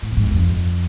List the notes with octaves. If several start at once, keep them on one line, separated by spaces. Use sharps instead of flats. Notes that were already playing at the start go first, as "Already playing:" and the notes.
A2
F2
G#2
F2